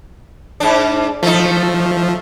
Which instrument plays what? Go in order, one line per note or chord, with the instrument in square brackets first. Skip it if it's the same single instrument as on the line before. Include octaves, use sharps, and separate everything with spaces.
[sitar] G#2 D4
[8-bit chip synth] F3 [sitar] A3 D#4